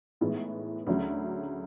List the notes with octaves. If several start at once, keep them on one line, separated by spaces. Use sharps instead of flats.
A2 E3 G#3 B3 D#4
D2 C#3 F#3